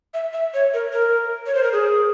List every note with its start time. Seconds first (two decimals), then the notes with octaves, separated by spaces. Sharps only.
0.14 E5
0.33 E5
0.54 C#5
0.74 A#4
0.93 A#4
1.46 C#5
1.55 C5
1.63 A#4
1.72 G#4